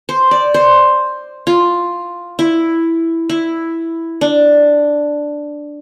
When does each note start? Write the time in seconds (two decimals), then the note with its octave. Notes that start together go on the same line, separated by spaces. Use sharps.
0.09 C5
0.31 D5
0.54 C5
1.47 F4
2.39 E4
3.29 E4
4.21 D4